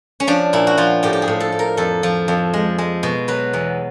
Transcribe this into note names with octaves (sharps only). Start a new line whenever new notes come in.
C#4
F3 D4
A#2 E4
F#4
F3 F4
A2 G4
G4
G#4
A2
A4
A2
A#4
F2 A4
F3
F2
G#3
G#3
B2
F#3 B4
E2